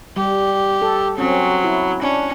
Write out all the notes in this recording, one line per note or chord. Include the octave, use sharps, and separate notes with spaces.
G3 G4
A4
F#3 C4 C#4
E4
C#4 D4